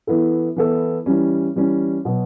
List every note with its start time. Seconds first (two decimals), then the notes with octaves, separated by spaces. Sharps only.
0.07 E3 B3 E4 A4
0.56 E3 B3 E4 A4
1.06 E3 G3 C#4
1.56 E3 G3 C#4
2.05 B2 F#3 B3